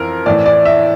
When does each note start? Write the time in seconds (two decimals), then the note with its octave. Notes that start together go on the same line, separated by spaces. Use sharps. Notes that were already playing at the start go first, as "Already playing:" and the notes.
Already playing: F2 E3 A#4
0.26 A2 E3 D5
0.46 D5
0.65 E5